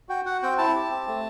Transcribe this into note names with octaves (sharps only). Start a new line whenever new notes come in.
F#4 G5
F#4 F#5
C4 G5
E4 A5
G4
C4
A3